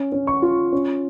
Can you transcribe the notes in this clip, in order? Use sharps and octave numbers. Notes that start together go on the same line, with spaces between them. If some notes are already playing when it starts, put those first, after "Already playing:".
Already playing: C#4
C#4
C#6
F4
C#4